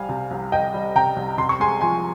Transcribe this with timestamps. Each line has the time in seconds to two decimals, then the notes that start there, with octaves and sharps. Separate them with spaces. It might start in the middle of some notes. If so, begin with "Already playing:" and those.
Already playing: C2 G3 F5 G#5
0.09 C3
0.31 C2
0.52 C2 D#5 G5
0.74 G3
0.95 C3 G5 A#5
1.16 C2
1.38 C3 C6
1.49 C#6
1.60 G#3 G#5 C6
1.81 F3 G#5 C6